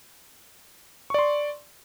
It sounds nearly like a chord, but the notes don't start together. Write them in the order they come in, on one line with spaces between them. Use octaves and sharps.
C#6 D5 C6